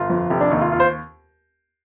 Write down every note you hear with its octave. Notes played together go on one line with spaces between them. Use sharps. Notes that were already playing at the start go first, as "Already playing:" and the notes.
Already playing: G1 F4
F2
F1 G4
D4
D#2 D#4
F4
F4
C5